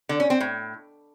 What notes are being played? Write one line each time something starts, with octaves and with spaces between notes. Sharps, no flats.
D3
C#4
C4
A2